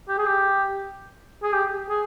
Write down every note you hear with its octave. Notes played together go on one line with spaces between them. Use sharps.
G4
G#4
G4
G#4
G4
G#4